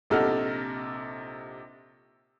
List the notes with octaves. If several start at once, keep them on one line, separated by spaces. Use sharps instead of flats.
A#1 C3 D#4 A4 F#5 F6